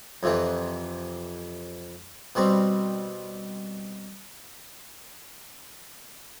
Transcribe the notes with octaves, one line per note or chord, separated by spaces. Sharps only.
F2 C3 E3
B2 G3 C4